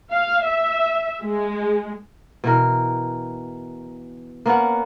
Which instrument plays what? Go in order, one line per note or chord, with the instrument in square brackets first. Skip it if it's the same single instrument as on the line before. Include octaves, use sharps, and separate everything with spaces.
[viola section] F5
E5
G#3
[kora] B2 E3 A#4
A#3 B3 C#4 F#5